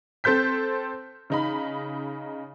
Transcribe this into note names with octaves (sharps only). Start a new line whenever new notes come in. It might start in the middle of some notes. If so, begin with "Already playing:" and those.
C4 A4 C5 G6 B6
C#3 D#4 B5